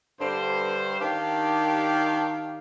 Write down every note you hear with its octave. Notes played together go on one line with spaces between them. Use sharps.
G2 D3 C5
D#3 D4 G4 F5